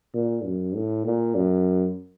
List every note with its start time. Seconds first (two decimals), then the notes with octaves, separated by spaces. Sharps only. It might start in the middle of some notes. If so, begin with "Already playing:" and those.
0.14 A#2
0.44 F#2
0.75 A2
1.05 A#2
1.35 F#2